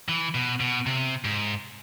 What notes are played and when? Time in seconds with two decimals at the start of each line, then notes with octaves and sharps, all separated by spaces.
0.09 E3
0.35 B2
0.60 B2
0.86 C3
1.25 G#2